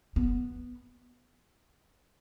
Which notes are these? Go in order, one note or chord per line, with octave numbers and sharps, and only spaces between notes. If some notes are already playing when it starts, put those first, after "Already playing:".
B3